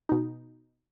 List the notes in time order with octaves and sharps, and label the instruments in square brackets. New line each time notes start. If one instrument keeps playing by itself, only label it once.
[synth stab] B2 D#4